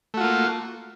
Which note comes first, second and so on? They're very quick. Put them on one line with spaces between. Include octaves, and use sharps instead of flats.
A3 F#4 F4 A#3